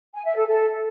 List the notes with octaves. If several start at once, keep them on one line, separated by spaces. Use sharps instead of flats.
G#5
E5
A4
A4